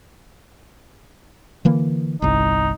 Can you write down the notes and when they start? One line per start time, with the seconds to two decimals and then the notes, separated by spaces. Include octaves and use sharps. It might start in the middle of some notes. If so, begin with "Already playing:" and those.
1.65 D3 E3 A#3
2.22 G1 C2 D#4